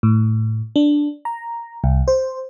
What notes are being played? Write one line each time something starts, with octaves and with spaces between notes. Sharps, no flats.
A2
D4
A#5
C2
C5